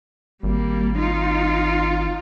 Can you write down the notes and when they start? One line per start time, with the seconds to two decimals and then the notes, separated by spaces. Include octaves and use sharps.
0.43 G#1 G3 A#3
0.99 D#4 F4